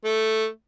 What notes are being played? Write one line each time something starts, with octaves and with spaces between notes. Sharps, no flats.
A3